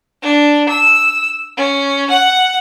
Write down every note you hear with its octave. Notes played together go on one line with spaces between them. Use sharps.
D4
E6
C#4
F#5